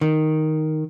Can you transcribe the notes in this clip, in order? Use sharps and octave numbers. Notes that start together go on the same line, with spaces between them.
D#3